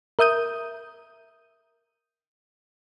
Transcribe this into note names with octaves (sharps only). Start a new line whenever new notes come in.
A#4 E5 D#6 G6 D#7